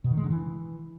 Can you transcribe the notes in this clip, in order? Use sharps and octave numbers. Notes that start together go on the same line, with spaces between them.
B2
D#3
G#3
D3
E3